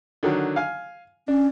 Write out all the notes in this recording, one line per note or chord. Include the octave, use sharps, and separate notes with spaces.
D3 D#3 F#3
F5 G#5
C#4 D4